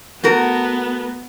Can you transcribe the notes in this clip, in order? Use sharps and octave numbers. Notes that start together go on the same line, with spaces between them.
A3 B3 F#4 A#4